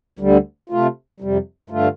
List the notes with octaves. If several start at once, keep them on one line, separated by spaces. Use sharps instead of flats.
D2 D3 G3
C3 A3 F4
F2 C3 G3
G2 D3 A3 F4